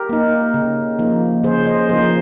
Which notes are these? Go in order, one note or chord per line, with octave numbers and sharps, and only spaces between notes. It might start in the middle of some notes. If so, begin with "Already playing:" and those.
Already playing: G4 A#4
A#3 D#4
C#3
F3 A#3 D#4
C#3 G#4 C5
C5 D#5
F3 A#3 D#4 G#4 C5